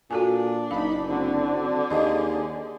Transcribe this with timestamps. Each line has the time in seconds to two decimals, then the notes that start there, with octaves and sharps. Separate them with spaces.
0.11 A#2 D4 F#4 A4 G#5
0.71 F#1 D#4 F5 B5
1.08 D3 C4 D4 F#4
1.90 D#2 G#4 D#5